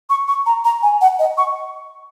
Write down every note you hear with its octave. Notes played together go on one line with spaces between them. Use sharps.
C#6
C#6
A#5
A#5
G#5
F#5
D#5
C#6